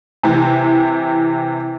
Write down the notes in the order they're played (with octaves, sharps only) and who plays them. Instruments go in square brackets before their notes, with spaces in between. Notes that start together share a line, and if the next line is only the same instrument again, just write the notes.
[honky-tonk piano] C3 E3